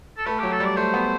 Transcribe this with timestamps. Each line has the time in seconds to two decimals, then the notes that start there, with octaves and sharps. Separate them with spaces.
0.18 A4
0.26 A3 B4
0.39 F#3 G4
0.52 A4
0.60 G3 D5
0.77 A3 C5
0.94 B3